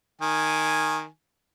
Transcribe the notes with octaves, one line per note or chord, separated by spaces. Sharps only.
D#3 G#5